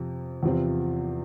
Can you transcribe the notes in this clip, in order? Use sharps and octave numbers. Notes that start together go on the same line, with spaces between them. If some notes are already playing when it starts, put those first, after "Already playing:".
Already playing: F2 C3
E2 C3 F3 C4 F4